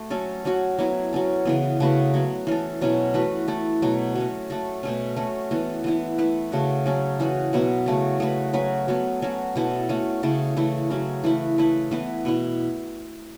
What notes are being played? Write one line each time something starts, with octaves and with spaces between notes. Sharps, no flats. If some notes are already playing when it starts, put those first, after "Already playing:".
Already playing: A3 F#4
F#3 C#4 A4
F#3 C#4 F#4
F#3 B3 E4
F#3 C#4 A4
C#3 E3 B3
C#3 A3 F#4 B4
F#3 B3 F#4
E3 C#4 A4
B2 F#3 C#4 E4
E3 A3 F#4 B4
A3 E4 A4
B2 F#3 A3 F#4
F#3 A3 C#4
A3 F#4 A4
B2 A3 C#4
A3 C#4 F#4
E3 B3 A4
E3 B3 E4
A3 E4 B4
C#3 A3 F#4
F#3 C#4 A4
E3 C#4 F#4
B2 F#3 B3 E4
C#3 A3 F#4
A3 F#4 B4
F#3 C#4 F#4 B4
F#3 B3 A4
F#3 C#4 F#4
B2 B3 E4 A4
A3 C#4 F#4
C#3 A3 E4 A4
C#3 E3 A3 E4
F#3 C#4 E4
E3 A3 E4 B4
A3 E4 B4
E3 B3 E4 B4
B2 B3 E4